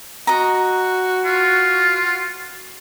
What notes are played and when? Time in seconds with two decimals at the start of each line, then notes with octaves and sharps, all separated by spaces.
0.27 F#4 D#5 A#5
1.25 F4